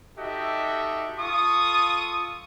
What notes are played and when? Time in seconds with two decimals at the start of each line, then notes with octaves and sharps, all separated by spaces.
0.17 D#4 F#4 G4 A4 D#5 E5
1.19 F4 A4 C#6 D#6